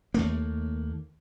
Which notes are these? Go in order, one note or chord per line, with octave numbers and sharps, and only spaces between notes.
D#2 A3 A#3